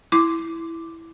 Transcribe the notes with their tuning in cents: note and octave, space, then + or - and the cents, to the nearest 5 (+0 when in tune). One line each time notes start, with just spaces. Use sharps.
E4 +0 D6 +0